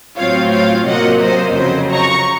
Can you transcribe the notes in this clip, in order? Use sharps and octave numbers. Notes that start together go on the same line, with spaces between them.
A2 F#3 C4 F4 C#5 F5
C#5 F5
C3 F#3 A#3 F4 D#5 F#5
C5 D#5
F2 C#3 F#3 C4 C5 D#5
A#5 C#6